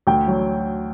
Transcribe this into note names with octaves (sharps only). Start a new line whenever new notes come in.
D2 G5
F#3